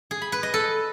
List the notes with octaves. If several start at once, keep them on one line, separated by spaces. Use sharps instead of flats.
G#4
B5
B4
D#5
A4